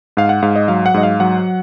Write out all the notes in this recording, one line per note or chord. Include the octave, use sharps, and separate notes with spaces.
G#2 F5
F#5
G#2 F5
D#5
F#3 F5
F#5
G#2 D#5
F5
F#3 F#5